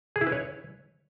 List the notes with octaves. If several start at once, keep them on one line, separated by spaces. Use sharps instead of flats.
G#4
E4
B4
C#5